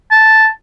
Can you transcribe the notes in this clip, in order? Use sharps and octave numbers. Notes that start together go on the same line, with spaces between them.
A5